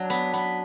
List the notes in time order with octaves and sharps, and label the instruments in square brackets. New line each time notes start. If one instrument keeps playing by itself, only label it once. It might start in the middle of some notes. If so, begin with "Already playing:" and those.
Already playing: [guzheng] F#3 [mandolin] D4
[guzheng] B3
B3